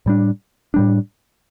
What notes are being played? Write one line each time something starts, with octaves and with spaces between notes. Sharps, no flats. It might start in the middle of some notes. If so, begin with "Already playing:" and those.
A2 G3 D4
A2 G3 D4